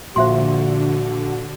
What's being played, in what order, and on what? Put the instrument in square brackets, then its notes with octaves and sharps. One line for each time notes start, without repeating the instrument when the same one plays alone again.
[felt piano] A#1 [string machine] D3 [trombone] F#4 [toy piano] C5 E5 C6